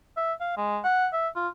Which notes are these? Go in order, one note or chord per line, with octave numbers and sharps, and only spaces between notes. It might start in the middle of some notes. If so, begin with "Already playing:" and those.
E5
F5
G#3
F#5
E5
F4